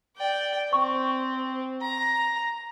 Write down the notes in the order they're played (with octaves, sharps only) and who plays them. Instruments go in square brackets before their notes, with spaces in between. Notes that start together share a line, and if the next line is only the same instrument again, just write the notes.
[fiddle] D5 G5
[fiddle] C4 [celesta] C#6
[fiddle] A#5